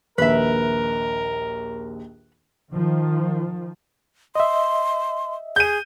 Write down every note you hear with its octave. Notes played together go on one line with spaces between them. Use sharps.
A#1 D#2 A#4 B4 E5
D#3 F3
D#5 E5 C6
G#4 G6 D#7